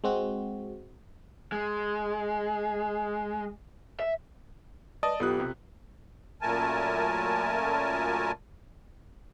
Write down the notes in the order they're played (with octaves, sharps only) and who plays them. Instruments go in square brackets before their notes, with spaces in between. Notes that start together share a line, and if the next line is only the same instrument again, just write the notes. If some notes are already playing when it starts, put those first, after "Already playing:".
[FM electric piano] G#3 C4 F#4
[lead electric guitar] G#3
E5
[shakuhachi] B4 [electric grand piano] D5 D#5 A5 [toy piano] D#6
[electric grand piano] B1 B3 F#6 [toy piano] F4 A4 [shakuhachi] G4
[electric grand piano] C3
[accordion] F#2 A#2 A3 A#4 G#5 A5